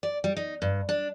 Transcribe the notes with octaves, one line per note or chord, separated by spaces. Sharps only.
D5
G3
D#4
G2
D4